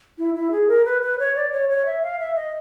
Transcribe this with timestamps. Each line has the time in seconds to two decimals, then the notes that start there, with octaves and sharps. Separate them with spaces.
0.18 E4
0.34 E4
0.51 G#4
0.68 A#4
0.85 B4
1.02 B4
1.19 C#5
1.36 D5
1.52 C#5
1.69 C#5
1.86 E5
2.03 F5
2.19 E5
2.35 D#5